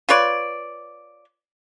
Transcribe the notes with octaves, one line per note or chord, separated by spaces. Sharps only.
F4 B4 C#5 D5